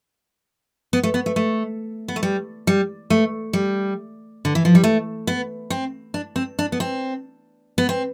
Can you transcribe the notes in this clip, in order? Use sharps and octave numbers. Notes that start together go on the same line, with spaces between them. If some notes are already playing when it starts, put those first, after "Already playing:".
B3
A3
B3
A3
A3
B3
A3
G3
G3
A3
G3
D3
E3
F3
G3
A3
B3
C4
D4
C4
D4
B3
C4
B3
C4